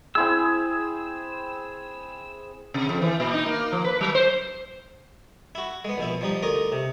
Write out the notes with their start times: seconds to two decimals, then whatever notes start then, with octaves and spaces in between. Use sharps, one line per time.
0.15 C4 E4 G#4 E6
2.74 C3
2.89 F2
3.02 E3
3.20 A#2
3.34 D#4
3.46 A#3
3.72 F3
3.84 B4
4.01 F#3
4.15 C5
5.55 E4 F#4
5.85 G#3 B3
5.98 A#1 B2 E4
6.21 F3 G3 D#4
6.42 D2 F4 A#4 D#5 D6
6.72 C3